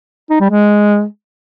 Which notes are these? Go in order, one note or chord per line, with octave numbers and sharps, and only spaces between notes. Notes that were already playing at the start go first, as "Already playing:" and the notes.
D#4
G3
G#3